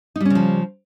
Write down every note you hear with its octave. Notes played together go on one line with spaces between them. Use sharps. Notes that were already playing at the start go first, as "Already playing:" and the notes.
C#3 F3 G3 C#4 D#4